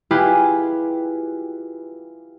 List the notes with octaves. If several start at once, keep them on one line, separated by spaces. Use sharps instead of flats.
E4 F4 G4 G#4 B4